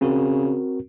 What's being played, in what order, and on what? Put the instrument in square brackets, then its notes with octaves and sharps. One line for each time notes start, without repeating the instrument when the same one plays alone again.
[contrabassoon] C#3 [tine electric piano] C4 F#4 A#4